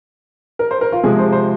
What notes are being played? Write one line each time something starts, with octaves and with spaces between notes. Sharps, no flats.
A#4
C5
A#4
F4
C3 F3 G#3 G#4
C5
C5